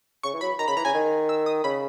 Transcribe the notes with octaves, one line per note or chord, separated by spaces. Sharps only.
C#3 C#6
E3
F#3 B5
D#3 A#5
C#3 B5
E3 A#5
C#3 G#5
D#3
E6
D#6
C#3 B5